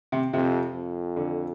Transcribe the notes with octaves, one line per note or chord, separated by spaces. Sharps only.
C3
F2 C3
F2
D3